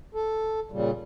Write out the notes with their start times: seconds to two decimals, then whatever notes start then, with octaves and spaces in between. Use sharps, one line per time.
0.14 A4
0.71 A#2 C#3 G3